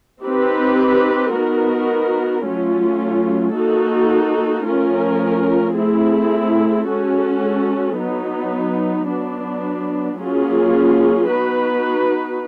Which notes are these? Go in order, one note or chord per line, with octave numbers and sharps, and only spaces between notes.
C4 D#4 G4 B4
B3 D#4 F#4 A#4
F#3 A3 C#4 F4
A#3 D#4 F#4 A4
F3 A3 C#4 F4 A#4
A3 C4 E4 G#4
G#3 C#4 F#4 A4
F#3 B3 D#4
F#3 B3 D4
F#3 A#3 C#4 F4 G#4
B3 D#4 F#4 B4